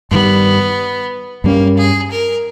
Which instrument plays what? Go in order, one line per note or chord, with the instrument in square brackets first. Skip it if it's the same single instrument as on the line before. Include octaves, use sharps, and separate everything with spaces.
[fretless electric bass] G2 D#3 G3 [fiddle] B3
[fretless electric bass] G2 G3 C#4 [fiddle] A#3
[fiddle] G#4
A#4